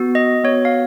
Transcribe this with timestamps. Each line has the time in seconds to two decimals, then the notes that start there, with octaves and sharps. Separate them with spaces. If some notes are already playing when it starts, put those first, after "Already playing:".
Already playing: B3 F#4
0.15 D#5
0.44 B3 F#4 C#5
0.65 F5